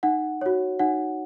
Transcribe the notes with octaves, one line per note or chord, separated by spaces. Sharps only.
D#4 F#5
F#4 C#5
D#4 F#5